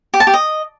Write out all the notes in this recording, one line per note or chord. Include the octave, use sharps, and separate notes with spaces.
G4
A5
G4
D#5